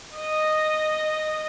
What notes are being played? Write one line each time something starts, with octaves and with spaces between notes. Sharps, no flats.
D#5